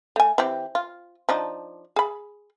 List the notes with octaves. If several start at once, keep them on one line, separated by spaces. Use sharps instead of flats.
A3 G#5
E3 C4 G4
F4
F3 D4 D#4
G#4 B5